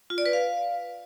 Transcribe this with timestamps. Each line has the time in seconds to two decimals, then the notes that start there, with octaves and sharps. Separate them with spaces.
0.10 F4
0.18 D5
0.26 B4
0.33 F5